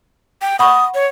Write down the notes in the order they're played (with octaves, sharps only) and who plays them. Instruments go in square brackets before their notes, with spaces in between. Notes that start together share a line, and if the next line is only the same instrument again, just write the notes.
[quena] G5
[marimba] F#5 B5 C#6 [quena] D#6
[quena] C#5